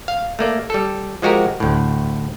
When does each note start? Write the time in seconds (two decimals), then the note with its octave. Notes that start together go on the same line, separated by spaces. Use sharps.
0.08 F5
0.39 A3 A#3 D5
0.70 G3 A4
1.22 F3 G#3 F#4 G4 A#4
1.60 D2 A2